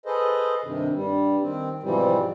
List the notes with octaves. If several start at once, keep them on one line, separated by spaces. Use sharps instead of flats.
G#4 A4 B4 C5 D#5
G2 C3 D#3
G2 G3
D#3 C4
G#2 B2 E3 F3 G3 C4